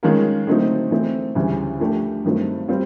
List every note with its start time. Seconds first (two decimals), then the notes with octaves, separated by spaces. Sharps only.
0.03 D#3 G#3 C#4 F4 A#4
0.47 D3 F#3 A3 C4 D#4
0.91 E3 A3 C4
1.35 D2 C#3 E3 G3
1.79 F3 A3 D4 G4
2.24 G2 D#3 F#3 A3 C4
2.68 G3 C4 F4